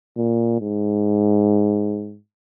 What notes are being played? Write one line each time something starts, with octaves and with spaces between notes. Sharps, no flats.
A#2
G#2